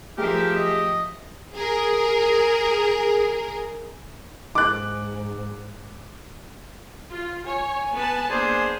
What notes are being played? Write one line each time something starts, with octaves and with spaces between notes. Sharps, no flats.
F3 A3 G4 G#4 A#4 E5 G5
D#5
G#4 A#4
G#2 D6 F#6
F4
C#5 G#5
B3 B4 A5
A#3 B3 D4 G#4 C5